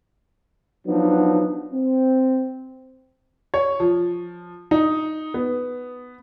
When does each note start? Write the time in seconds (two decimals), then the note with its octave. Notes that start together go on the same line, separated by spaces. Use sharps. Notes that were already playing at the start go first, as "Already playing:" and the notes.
0.86 F3 F#3 B3 D4 D#4
1.72 C4
3.54 C#5
3.80 F3
4.71 D#4
5.34 B3